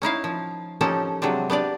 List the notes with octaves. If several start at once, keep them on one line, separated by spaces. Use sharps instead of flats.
C#4 D#4 E4 F5
F3
F3 C#4 D#4 G4 A4
C3 F#3 G#3 C4 D4
B3 D4 G4 D5